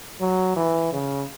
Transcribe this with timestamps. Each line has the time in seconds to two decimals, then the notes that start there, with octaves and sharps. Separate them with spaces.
0.20 F#3
0.56 E3
0.93 C#3